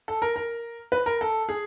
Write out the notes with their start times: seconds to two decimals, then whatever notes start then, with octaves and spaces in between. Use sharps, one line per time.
0.08 A4
0.22 A#4
0.36 A#4
0.92 B4
1.06 A#4
1.21 A4
1.49 G#4